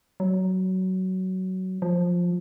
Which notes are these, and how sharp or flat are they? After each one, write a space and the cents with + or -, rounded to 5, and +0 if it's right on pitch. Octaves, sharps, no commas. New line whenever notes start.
F#3 +15
F3 +10